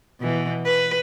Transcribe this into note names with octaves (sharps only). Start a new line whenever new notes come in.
B2 E3
B4